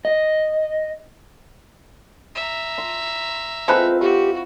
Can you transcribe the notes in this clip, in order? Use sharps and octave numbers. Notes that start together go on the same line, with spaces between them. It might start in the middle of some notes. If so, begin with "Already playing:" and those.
D#5
E5 A#5
C6
G#3 C4 E4 F4 A4 B4 C5
F#4 G4 C#6